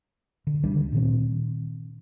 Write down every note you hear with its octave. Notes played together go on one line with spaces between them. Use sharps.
D3
D2 D#3 G3 D4
A#2 D#3 C4